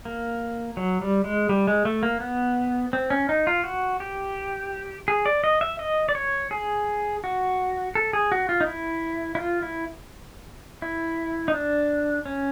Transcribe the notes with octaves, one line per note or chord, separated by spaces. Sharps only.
A#3
F#3
G3
G#3
G3
G#3
A3
A#3
B3
C4
C#4
D#4
F4
F#4
G4
G#4
D5
D#5
E5
D#5
D5
C#5
G#4
F#4
A4
G#4
F#4
F4
D#4
E4
E4
F4
E4
E4
D#4
D4
C#4